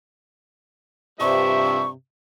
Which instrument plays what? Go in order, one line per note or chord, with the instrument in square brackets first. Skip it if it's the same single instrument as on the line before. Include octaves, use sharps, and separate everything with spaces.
[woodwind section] G2 C3 [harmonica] F3 G3 E5 [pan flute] C#6